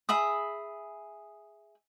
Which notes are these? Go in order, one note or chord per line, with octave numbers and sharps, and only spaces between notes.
G#4 E5 B5 D#6